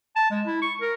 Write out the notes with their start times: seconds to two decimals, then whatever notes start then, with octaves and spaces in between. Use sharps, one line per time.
0.16 A5
0.31 G#3
0.47 E4
0.62 C#6
0.81 A#4